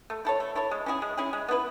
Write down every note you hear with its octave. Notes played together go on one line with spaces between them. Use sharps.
A3
E4 A4 C#5
A3
E4 A4 C#5
G#3
C#4 E4 G#4
G#3
C#4 E4 G#4
G#3
B3 E4 B4